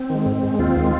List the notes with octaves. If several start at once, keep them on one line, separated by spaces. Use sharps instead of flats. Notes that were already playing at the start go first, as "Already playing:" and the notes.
Already playing: C4
D#3 G#3
G#2
G#3
D#2 C4 F4
D#3 G#3